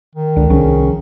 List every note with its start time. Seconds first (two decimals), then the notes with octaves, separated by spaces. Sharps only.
0.15 D#3
0.36 C#2 D3
0.50 C2 C#3 F3